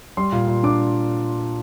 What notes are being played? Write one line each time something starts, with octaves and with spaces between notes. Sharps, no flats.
G3 C6
A#2
A#2
D4 D6